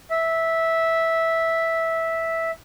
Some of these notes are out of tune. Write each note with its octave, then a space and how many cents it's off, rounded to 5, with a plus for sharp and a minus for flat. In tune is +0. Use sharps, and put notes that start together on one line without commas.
E5 -10